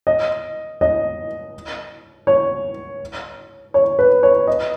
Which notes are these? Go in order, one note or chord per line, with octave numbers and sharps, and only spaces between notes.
D#5
D#5
C#5
C#5
B4
C#5
D#5